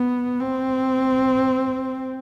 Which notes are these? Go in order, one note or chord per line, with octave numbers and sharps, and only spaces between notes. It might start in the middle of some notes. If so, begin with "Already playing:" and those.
Already playing: B3
C4